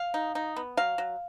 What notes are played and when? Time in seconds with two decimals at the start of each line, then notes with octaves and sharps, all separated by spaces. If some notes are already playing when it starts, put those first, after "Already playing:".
Already playing: F5
0.14 D#4
0.35 D#4
0.56 B3
0.77 F#3 F5
0.98 F#3